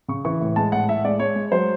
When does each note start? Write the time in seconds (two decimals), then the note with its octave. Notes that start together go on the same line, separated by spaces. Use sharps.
0.08 C#3 C#6
0.25 E3 C#6
0.41 A2
0.56 G#3 A5
0.72 A2 F#5
0.88 A2 E5
1.05 G#3 D5
1.19 G#3 C#5
1.36 G#3
1.51 F#3 C5